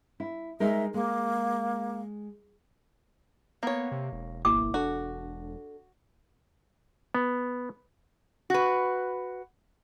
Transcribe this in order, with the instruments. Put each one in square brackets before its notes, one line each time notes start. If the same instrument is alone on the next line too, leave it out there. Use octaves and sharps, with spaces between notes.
[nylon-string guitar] E4
[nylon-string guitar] G#3 D#4 A#4 [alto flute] E5
[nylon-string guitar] G#3 [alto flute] A#3
[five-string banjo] A#3 C#5 [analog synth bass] B3
[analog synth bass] C3
E1
[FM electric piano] G#1 A#3 E4 [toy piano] D6
[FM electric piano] D4 A4 [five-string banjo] F#4
[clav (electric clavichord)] B3
[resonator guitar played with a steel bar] F#4 B4